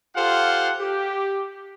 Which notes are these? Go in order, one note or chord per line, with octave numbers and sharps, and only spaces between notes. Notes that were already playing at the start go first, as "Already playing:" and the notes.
F4 G4 A4 C5 F5 F#5
G4